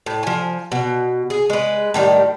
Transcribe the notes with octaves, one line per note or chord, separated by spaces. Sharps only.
A2
F3 G#5
B2
G#4
G#3 B4
A2 D#3 F3 G3